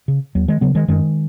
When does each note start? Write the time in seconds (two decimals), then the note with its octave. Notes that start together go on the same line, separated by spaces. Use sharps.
0.08 C#3
0.35 D#2 F#3
0.48 D#3 G#3
0.61 C#3 F#3 B3
0.75 D#3 G#3
0.88 F#2 D#3 G#3